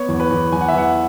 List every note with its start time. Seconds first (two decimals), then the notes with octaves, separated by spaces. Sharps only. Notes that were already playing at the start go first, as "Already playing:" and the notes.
Already playing: B3 C#5
0.08 E2
0.20 B4
0.31 E2
0.52 E2 G#5
0.61 F#5
0.68 E5
0.74 E2 F#5